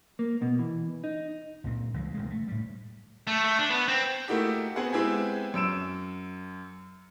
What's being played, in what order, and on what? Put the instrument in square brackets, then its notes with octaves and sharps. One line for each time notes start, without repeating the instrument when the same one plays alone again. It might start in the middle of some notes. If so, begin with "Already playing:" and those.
[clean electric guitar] A#3
B2
E3
D#4
[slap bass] C#2 A#2 C4
C#2 E3 G3 G#3
E1 D2 G#3
A3
A2 G3
[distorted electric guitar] A3
A3
D4
B3
C4
[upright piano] A3 A#3 D#4 E4 F#4 G4
B3 C4 F#4 G#4 F#5
G#3 B3 C4 E4 G4 G#4
F#2 E6 D7 E7